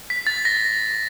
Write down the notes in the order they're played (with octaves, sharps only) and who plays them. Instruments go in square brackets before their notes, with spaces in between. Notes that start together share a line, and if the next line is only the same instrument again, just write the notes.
[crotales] B6
A6
A#6